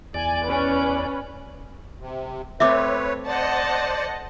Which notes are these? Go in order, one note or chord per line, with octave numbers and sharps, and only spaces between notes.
E2 D5 G#5
C#4 B4
C3
A3 C4 B4 C#5 E5 D6
C5 D5 D#5 F#5 A5